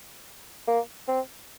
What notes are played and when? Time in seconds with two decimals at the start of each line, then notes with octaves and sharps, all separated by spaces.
0.68 A#3
1.08 C4